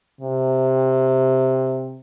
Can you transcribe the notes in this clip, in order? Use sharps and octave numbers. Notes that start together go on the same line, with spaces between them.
C3